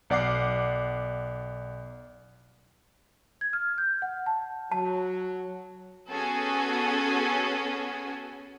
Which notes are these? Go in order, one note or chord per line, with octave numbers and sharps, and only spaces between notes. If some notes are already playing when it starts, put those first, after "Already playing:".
B1 D5 F#5 D6 C7
G#6
F6
G6
F#5
A5
F#3 A5
B3 C#4 F#4 G#4 A4 G#5